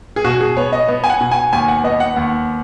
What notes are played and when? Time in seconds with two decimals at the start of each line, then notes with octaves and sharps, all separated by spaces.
0.16 G#4
0.24 B2 F#4
0.41 G#4
0.57 B3 C#5
0.73 D#5
0.88 B3
1.04 G#5
1.10 F#5
1.21 B2
1.31 G#5
1.53 D#2 G#5
1.68 F#5
1.84 B3 D#5
2.00 F#5
2.16 D#2 F#5